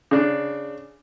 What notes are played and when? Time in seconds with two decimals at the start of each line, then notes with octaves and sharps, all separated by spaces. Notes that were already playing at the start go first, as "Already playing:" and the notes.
0.11 C#3 D4